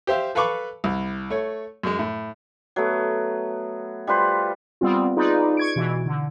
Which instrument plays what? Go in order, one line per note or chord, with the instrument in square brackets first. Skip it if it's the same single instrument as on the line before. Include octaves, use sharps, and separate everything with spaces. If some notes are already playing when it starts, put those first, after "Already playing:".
[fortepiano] G4 C5 E5 F5
A4 B4 F5 B5 C#6 D6
C2
A3 C#5
F#2 G#3
A2
[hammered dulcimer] F#3 A3 B3
G3 F4 B4 C5
[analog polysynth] G3 B3 C4 F4
D#4 F4 G#4 B4 D5
C#6 G#6 D7
B2 E3
D3